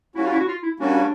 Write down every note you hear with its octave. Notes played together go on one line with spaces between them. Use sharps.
G3 A#3 C#4 E4 F#4
F4
E4
F#4
F4
E4
G3 A#3 C#4 D4 F#4